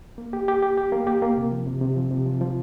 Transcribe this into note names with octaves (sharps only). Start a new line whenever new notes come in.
A#3
G4
G4
G4
G4
A#3
G4
A#3
C3
F3
C3
C3
F3
C3
F3
F3